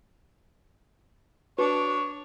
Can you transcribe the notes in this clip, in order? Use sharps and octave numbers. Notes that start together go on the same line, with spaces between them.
D4 F#4 B4 C#5